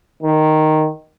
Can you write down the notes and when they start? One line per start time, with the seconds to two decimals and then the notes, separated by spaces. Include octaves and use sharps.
0.22 D#3